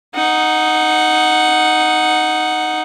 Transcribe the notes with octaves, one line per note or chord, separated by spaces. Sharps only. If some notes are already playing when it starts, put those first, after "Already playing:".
D#4 F#5